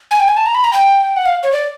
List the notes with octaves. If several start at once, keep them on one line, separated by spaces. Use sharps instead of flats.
G#5
G5
G#5
A5
A#5
B5
A#5
G5
F#5
F5
C#5
D5